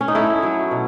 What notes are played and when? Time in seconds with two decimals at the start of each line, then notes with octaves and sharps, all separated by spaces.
0.01 C#4
0.08 D#4
0.15 A3 E4
0.43 F#3
0.71 B2